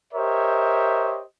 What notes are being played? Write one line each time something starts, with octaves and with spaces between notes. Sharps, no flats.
G4 A#4 C5 C#5 D#5 E5